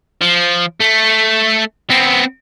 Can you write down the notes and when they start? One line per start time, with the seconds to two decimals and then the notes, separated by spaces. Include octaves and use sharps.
0.21 F3
0.81 A3
1.90 B3 C4